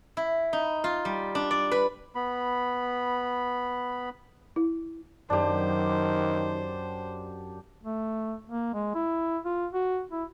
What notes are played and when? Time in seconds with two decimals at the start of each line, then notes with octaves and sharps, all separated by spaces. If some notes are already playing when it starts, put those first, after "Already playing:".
0.17 E4
0.53 D#4
0.84 F4
1.05 G3
1.35 D4
1.51 D5
1.71 B4
2.15 B3 B5
4.56 E4
5.30 F#2 D#3 D4 G4 C5
7.84 A3
8.50 A#3
8.74 G#3
8.95 E4
9.45 F4
9.73 F#4
10.12 E4